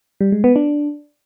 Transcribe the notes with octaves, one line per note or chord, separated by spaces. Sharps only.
G3
G#3
B3
D4